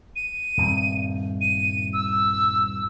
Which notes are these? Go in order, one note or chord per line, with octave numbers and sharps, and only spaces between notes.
D#7
D#1 G2 C4
D#7
E6